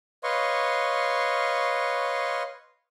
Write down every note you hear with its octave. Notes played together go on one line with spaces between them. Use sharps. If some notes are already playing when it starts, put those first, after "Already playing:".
B4 C#5 D#5 F5 C6 C#6